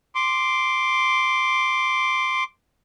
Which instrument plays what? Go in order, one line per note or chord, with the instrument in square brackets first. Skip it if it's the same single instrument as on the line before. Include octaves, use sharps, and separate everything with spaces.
[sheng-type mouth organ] C6 D6